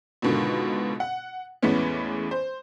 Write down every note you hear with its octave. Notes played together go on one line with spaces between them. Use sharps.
C#2 G#2 B2 D3 D#3
F#5
E2 A2 E3 G#3 B3 C#4
C5